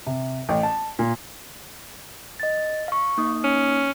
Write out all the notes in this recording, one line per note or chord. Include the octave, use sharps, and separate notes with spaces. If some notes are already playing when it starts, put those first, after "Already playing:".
C3
A1
A5
A#2
D#5 A6
F5 C#6
A#3 D#4 D#6
C#4